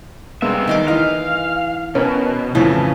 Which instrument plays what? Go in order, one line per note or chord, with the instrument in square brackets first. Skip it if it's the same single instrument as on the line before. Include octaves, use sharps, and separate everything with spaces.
[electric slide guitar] G3 E5 [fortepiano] G#3 A#3 B3
[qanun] D#3 C6 D6
[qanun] E3 [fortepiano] D#5 [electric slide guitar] F5
[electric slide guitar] B2 [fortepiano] C#4 A#4 B4
[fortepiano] F2 A2 [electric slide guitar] C#3 [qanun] E3